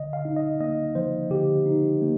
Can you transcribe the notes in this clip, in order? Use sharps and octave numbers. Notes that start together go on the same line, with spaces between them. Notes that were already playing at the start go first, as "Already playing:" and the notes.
Already playing: D3 D#5
F5
D#4
D#5
A#3 D#5
F3 C5
D3 G4
D#4
A#3